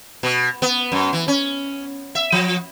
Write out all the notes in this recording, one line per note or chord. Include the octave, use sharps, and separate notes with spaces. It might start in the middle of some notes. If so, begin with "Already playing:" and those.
B2
B3
F#2
E3
C#4
E5
F3